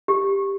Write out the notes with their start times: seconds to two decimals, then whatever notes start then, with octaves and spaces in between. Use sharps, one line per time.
0.08 G4